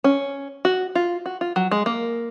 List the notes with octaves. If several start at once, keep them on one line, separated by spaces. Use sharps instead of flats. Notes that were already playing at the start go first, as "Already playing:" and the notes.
C#4
F#4
F4
F#4
F4
F#3
G#3
A#3